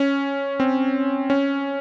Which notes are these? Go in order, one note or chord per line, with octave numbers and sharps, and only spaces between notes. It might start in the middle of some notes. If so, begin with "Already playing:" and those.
Already playing: C#4
C4
C#4